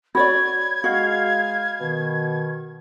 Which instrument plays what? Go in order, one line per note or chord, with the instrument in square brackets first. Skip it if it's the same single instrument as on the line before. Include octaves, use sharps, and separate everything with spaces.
[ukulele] F#4 C#5 D5 [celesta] B5 [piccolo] G#6
[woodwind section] G#3 F5 [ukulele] F#4
[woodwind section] B2 D#3